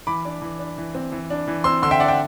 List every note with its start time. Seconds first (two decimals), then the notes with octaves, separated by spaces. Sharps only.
0.07 E3 B5 D6
0.25 D4
0.42 E3
0.59 D4
0.78 E3
0.95 C4
1.12 E3
1.30 D4
1.48 E3
1.64 C4 C6 E6
1.82 D3 C6 E6
1.91 E5 G5
2.00 D4 D5 F#5
2.08 E5 G5